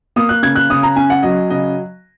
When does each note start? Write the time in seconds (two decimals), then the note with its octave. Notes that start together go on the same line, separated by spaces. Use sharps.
0.16 A#3 D#6
0.29 F#6
0.43 C#3 G#6
0.56 F#6
0.70 C#3 D#6
0.83 A#5
0.96 C#4 G#5
1.10 F#5
1.23 F#3 D#5
1.50 C#3 D#5